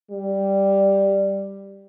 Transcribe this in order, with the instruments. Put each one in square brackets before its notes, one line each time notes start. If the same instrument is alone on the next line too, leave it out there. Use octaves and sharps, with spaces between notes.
[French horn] G3